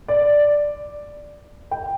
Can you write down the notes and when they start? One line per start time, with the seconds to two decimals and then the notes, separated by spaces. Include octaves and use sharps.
0.08 D5
1.71 G5